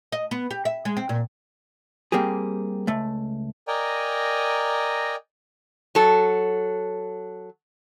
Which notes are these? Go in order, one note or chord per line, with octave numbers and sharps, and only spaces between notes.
D#5
B3
G4
E5
G#3
C4
A#2
G3 A#3 C4 G4 G#4
C#2 A3
A#4 D5 D#5 G5 G#5 A#5
F#3 A4